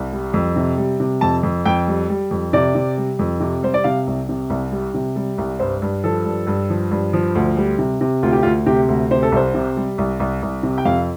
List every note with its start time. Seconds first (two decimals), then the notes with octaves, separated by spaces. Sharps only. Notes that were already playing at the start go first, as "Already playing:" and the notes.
Already playing: C2
0.12 G3
0.34 F2
0.56 C3
0.77 G3
1.00 C3
1.21 F2 A5
1.43 F2
1.65 F2 G5
1.87 G3
2.10 G3
2.31 F2
2.53 C3 D5
2.75 C3
2.97 G3
3.19 F2
3.40 C3
3.63 G3 C5
3.74 D5
3.84 C3 F5
4.07 C2
4.29 C3
4.50 C2
4.72 G3
4.94 C3
5.16 G3
5.38 C2
5.59 G2 C5
5.82 G2
6.04 F3 A4
6.25 G2
6.47 G2
6.70 F3
6.91 G2
7.13 F3
7.35 D2
7.57 G3
7.78 C3
8.01 C3
8.23 D2 F4
8.32 G4
8.43 D2 F4
8.66 C3 G4
8.89 D2
9.11 C3 C5
9.23 A4
9.32 C2 C5
9.54 C3
9.77 G3
9.98 C2
10.20 C2
10.42 C2
10.63 C3
10.78 G5
10.85 F2 F5